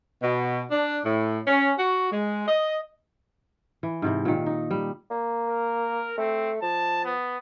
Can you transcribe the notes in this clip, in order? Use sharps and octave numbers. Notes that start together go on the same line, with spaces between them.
B2
D4
A2
C#4
F#4
G#3
D#5
E3
G#2 C3 E3
A#2 D#3
D#4
G3
A#3
A#4
A3 C4
F3 A5
B3